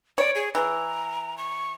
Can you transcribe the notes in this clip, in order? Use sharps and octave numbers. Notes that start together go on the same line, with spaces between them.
C#5 D5
G#4
E3 A#5
C#6